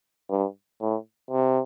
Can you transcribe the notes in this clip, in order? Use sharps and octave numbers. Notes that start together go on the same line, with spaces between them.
G2
A2
C3